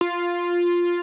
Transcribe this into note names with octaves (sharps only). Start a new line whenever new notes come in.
F4